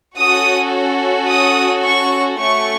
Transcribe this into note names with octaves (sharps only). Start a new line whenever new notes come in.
C#4 F#4 A4 D#6
D#6
C#6
A3 C#4 F#4 A4 C#6